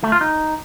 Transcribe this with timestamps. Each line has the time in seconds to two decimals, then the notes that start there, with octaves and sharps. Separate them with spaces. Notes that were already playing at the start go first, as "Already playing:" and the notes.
0.03 A3
0.12 F4
0.21 D#4